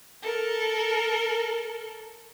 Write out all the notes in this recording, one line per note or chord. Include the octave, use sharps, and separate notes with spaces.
A4 A#4